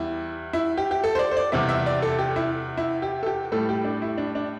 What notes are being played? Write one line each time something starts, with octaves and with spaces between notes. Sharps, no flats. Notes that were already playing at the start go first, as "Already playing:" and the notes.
Already playing: E2 G3 E4
E4
G4
G4
A4
C5
D5
C5
D5
E2 C3 G3 E5
E5
D5
A4
G4
E4
E4
G4
A4
G4
A2 G3 A4
G4
D4
E4
D4
D4